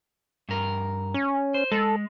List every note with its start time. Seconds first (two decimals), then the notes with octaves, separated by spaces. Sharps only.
0.49 G2 A#4
1.14 C#4
1.54 C5
1.72 G#3 A4